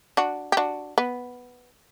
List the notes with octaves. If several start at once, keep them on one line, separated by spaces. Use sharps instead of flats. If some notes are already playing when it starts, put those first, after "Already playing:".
D4 F#4
G4
D4 F#4
B3